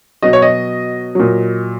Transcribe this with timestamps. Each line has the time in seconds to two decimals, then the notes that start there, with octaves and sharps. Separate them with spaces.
0.22 B2 F#3 D#5
0.33 C#5
0.42 D#5
1.15 A#2 F#3